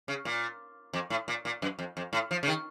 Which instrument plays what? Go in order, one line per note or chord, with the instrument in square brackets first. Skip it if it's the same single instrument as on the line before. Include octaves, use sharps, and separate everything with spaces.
[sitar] C#3
A#2
F2
A2
A#2
A#2
F#2
F2
F2
A2
F3
C#3
D#3